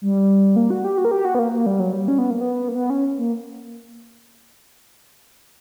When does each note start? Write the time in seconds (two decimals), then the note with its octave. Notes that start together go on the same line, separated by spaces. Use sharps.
0.02 G3
0.56 A#3
0.70 F#4
0.84 G4
0.98 F#4
1.05 A#4
1.11 G4
1.25 F#4
1.35 B3
1.39 A#3
1.52 A#3
1.66 G3
1.80 F#3
1.93 G3
2.08 C#4
2.18 B3
2.30 A#3
2.41 B3
2.68 A#3
2.76 B3
2.90 C#4
3.18 A#3